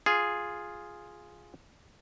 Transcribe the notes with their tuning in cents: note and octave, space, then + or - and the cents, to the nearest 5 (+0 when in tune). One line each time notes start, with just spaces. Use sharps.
F4 +0 G#4 +0